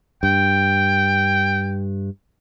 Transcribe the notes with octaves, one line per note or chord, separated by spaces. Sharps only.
G2 G5